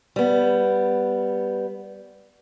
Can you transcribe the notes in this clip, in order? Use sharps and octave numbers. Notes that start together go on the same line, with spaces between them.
G3 B3